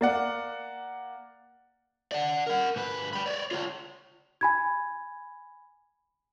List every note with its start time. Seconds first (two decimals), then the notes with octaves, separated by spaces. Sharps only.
0.01 A#3 D5 F#5
2.12 D5 F#5
2.47 A#4 F#5
2.76 G#2 B4
3.13 G5 B5
3.26 C#5 D5
3.51 F4 C#5
4.41 G#5 B5 G#6